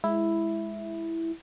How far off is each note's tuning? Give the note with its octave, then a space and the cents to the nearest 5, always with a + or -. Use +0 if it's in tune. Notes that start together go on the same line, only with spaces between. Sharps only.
G#3 +0 E4 +0